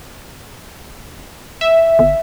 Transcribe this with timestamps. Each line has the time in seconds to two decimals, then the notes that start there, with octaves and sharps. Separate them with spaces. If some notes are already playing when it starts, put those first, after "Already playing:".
1.61 E5
1.99 G1